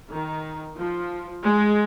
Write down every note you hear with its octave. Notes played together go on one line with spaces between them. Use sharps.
D#3
F3
G#3